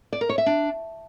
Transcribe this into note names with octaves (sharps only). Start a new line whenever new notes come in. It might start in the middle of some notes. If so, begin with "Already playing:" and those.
D5
A#4
C#5
E5
D4